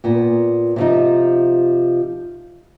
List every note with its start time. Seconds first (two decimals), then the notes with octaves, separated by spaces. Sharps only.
0.04 A#2 B3
0.76 C3 F3 D#4